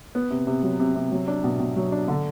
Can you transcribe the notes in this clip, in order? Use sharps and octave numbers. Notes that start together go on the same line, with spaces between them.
B3
C3
C3
F#3
C3
C3
F#3
D4
B2
B2
F#3
D4
D3